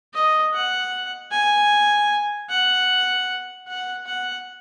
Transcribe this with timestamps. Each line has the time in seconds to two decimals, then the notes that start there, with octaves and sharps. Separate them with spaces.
0.14 D#5
0.53 F#5
1.31 G#5
2.50 F#5
3.68 F#5
4.06 F#5